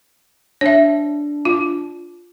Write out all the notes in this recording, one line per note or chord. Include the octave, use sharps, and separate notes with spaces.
D4 C#5 E5
F4